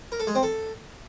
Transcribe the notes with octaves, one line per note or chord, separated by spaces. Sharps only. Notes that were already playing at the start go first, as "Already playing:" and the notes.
A#4
A4
G#3
C4
A4